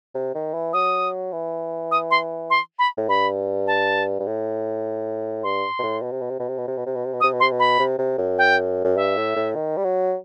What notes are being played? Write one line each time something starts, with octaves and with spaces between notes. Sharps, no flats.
C3
D#3
E3
F#3 D#6
E3
D#6
C6
C6
B5
A2
G2 B5
A5
G2
A2
G2 C6
B2
A2
B2
C3
B2
C3
B2
C3
B2
C3
B2
C3
B2
C3
B2
D#6
C3
B2
C3 C6
B2
B5
C3
C3
F#2
G5
F#2
G2 E5
A2
A2
D#3
G3
F#3